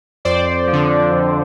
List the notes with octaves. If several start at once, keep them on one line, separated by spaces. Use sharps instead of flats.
F2 C5 D5
F3
D3
F2